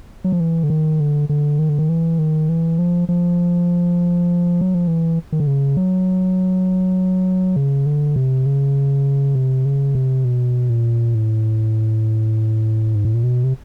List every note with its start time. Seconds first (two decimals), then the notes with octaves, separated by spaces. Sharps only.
0.24 F#3
0.32 F3
0.40 E3
0.63 D3
0.70 D#3
1.00 D3
1.29 D3
1.59 D#3
1.69 D3
1.79 D#3
1.89 E3
2.19 D#3
2.49 E3
2.79 F3
3.09 F3
4.61 F#3
4.74 F3
4.88 E3
5.32 D#3
5.40 D3
5.47 C#3
5.77 F#3
7.56 C#3
7.86 D3
8.16 C3
8.46 C#3
9.35 C3
9.65 C#3
9.95 C3
10.25 B2
10.70 A#2
11.15 A2
12.95 G#2
13.05 A2
13.14 A#2
13.24 B2
13.44 C3